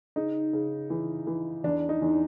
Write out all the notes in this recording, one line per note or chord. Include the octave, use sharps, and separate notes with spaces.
C#3 D#4
C#3
E3
E3
E2 D4
D#4
E2